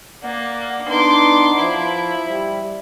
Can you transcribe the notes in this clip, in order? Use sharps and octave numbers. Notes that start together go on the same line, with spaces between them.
A#3 D5 F#5
B3 D4 D#4 C6 D6
F3 E4
G3